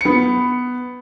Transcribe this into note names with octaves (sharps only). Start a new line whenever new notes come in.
B3 C#7